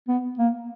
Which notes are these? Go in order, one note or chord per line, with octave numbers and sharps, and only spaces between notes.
B3
A#3